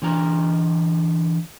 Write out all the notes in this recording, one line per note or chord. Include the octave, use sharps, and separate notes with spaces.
D3 E3 D4 A#5